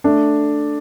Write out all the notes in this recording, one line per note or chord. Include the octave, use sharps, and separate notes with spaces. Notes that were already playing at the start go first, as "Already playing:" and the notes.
A3 D4